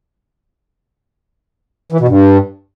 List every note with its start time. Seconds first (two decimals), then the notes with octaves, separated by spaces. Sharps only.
1.92 E3
2.00 B2
2.08 G2